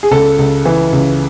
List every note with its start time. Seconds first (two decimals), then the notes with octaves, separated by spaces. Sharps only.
0.03 G#4
0.11 C#2 A4
0.38 C#2
0.65 E3
0.93 C#2